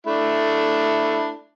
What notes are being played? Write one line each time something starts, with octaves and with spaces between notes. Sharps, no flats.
A3 D4 E4